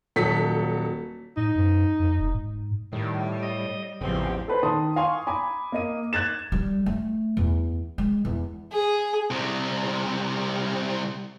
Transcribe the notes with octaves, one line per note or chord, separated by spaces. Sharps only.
D#1 F#3 A4 B6
A2 D#4
F#2
F2
F1
G#2
A2 D#3 G3
D#5
A1 E2 C#3 F3 C4 G4
A4 B4 C5
D#3 A5 C6 D#6
F5 G#5 C6 C#6
G#5 A#5 B5 D6
A#3 D#5 D#7
F#6 G#6 A6 E7
G3
A3
E2
G#3
E2
G#4
C2 C3